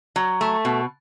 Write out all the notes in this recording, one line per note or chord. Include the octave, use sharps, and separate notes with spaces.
F#3
A3
B2